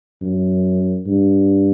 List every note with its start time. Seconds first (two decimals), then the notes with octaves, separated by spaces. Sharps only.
0.22 F#2
1.07 G2